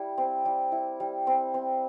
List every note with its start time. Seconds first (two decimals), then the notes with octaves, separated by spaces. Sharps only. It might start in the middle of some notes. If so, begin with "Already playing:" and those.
Already playing: G3 E4
0.18 C4
0.45 G3
0.72 E4
1.00 G3
1.27 C4
1.54 C4